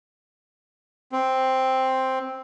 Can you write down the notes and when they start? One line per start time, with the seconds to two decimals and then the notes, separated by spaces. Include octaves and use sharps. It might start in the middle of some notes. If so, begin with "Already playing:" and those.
1.12 C4